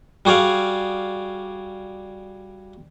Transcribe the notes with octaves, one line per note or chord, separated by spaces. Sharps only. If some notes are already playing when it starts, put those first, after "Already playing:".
G3 F#4 G#4 D5 F5